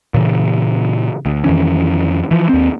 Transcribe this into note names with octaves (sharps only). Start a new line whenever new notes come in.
A#2 C#3 E3
D2
F2 D#3 E3 C#4
E3 F3
D#2 C4